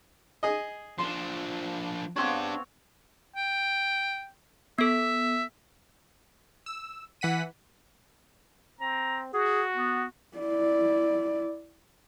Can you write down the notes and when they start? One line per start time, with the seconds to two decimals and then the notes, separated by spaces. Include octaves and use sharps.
0.43 G#4 D#5
0.98 F3 D4 C6
2.16 B3 C4 D4 G4 C#5
3.35 G5
4.78 B3 A4 E5
6.66 E6
7.21 E3 F#5 B6 D#7
8.80 C4 A#5
9.33 F#4 G#4
9.75 B3
10.38 E4 D5